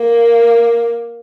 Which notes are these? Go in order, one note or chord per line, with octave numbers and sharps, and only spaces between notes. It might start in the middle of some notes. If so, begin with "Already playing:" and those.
Already playing: A#3